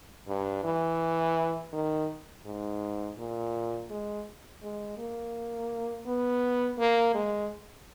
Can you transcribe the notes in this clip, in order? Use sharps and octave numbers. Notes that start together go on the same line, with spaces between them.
G2
E3
D#3
G#2
A#2
G#3
G#3
A#3
B3
A#3
G#3